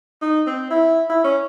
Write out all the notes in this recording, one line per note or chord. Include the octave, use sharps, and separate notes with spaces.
D#4
C4
E4
E4
C#4